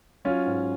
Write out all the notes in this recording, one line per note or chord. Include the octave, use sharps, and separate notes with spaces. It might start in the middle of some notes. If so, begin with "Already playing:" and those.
F#3 C#4 F4
G#2